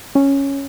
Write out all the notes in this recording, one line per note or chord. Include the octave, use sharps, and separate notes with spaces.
C#4